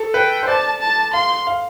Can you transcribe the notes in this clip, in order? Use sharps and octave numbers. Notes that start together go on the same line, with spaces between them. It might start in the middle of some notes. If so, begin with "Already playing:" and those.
Already playing: A4
B4 G5
C5
D5 A5
A5
F5 C6
F5